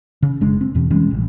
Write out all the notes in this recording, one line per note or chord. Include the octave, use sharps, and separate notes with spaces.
C#3
F#1 G#3 D4
C4
E2 B2 E3
E3 G3 G#3 C#4
A1